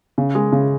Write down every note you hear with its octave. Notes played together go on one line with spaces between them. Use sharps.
C#3
G#3
C#3